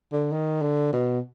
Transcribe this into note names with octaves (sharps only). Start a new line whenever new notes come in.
D3
D#3
D3
B2